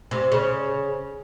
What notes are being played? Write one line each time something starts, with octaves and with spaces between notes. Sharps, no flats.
C3
C#3